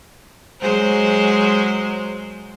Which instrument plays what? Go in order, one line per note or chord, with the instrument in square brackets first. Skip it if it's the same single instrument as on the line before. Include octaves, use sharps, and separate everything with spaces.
[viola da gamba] F#3 G#3 C5